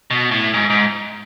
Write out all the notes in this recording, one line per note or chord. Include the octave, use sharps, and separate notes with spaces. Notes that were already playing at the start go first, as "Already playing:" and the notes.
B2
A2
G#2
G#2